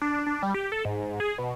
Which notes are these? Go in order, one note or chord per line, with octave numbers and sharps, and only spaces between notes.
D4
D4
G3
G4
A4
G#2
G#4
B2